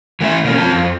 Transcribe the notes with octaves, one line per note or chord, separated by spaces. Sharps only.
E3 A3 C#4 E5
B2 A#3 C#4
F3 C4 F4 A5
F2